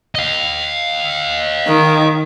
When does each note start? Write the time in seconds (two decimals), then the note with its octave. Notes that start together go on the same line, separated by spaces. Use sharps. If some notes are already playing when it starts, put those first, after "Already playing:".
0.15 D#5 F5
1.68 D#3